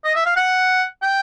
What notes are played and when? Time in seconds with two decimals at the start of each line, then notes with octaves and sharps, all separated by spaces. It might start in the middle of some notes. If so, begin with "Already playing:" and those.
0.05 D#5
0.16 E5
0.26 F5
0.37 F#5
1.03 G5